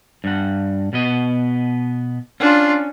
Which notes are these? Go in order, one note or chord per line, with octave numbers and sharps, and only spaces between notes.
G2 F#5
B2 B3 D#5
C#4 D4 F4